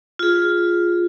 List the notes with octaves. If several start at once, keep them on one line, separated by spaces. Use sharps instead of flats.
F4 G#4